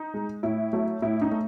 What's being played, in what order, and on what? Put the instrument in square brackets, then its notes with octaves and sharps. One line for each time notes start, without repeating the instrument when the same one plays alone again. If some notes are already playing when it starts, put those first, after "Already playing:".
Already playing: [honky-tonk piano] D#4
G#3
A2 E4
F#3 A3
A2 E4
D#4
A3